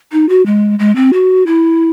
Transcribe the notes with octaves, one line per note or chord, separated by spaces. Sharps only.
D#4
F#4
G#3
G#3
C4
F#4
E4